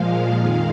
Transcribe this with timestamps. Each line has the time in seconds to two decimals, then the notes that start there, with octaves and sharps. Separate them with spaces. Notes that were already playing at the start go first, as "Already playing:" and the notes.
Already playing: A#2 F3 G#3 F5
0.37 F2 D#3 G#3 F5